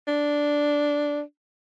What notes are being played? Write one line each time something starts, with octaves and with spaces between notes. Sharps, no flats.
D4